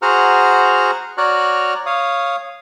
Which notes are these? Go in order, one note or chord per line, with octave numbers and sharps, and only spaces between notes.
F#4 G#4 C5 F#5 A#5 F6
F#4 C#5 D5 A#5 F6 F#6
C#5 F5 D#6